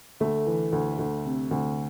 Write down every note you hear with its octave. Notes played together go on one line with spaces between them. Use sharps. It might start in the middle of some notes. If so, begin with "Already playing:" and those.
D2 A3
E3
D2
D2
C3
D2